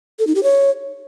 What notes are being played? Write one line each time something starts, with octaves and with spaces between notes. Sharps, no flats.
A4
D#4
G4
C#5